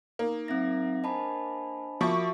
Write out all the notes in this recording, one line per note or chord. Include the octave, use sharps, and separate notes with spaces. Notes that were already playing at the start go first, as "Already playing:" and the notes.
A#3 D#4
F#3 C4 D#4 E5 A#6
D4 C5 D#5 G#5 A5 B5
F3 F#4 A#4 E5 B5 C#6 D6